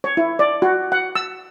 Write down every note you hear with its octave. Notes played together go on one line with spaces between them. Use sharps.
C#5
E4
D5
F#4
F#5
E6